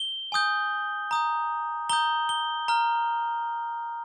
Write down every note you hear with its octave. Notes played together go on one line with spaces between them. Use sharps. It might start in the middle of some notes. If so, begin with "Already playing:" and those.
Already playing: G7
G#5 D#6 G6
A#5 D#6 G6
A#5 D#6 G6 G7
G7
A#5 F6